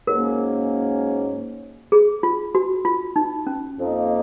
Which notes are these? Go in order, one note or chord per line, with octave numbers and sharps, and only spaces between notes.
G#2 F#3 A#3 C#4 A#4
G#4
F4
F#4
F4
D#4
C#4
F2 F3 A#3 D#4